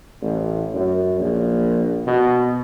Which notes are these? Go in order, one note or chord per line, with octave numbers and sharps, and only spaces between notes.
A1
F#2
A#1
B2